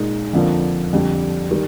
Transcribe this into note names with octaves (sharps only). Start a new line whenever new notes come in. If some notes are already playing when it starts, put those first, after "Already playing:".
Already playing: A#2 G#3 D#4
F2 D3 F3 A#3
F2 D3 G3
D#3 G3